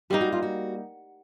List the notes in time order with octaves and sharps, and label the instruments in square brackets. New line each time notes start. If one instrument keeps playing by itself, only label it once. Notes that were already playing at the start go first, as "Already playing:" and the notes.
[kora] G3 A#3 D#4 [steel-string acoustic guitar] G4
[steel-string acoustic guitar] F#4
F4
F#4